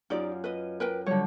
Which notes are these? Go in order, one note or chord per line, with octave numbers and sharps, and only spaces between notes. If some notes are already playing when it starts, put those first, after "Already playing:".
F#2 D#4 F4 G4 D5
B4 D#5
A#4 B4 G5
D3 F#3 G3 C#5